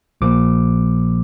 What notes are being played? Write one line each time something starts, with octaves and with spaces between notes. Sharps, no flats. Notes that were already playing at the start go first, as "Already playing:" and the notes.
A#1 A#2 F3 A#3 D6